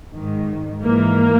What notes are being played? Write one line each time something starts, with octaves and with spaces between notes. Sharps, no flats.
G#2 D#3
G#2 E3 A#3